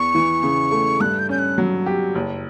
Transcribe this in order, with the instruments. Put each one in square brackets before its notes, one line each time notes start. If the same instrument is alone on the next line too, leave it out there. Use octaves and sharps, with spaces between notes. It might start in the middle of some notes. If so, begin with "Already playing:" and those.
Already playing: [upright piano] E2 [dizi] C#6
[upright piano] E3
C#3
A3
[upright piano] G2 [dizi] F#6
[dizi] G6
[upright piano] C#4 [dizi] G6
[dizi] F#6
[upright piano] F#3
G4
F#1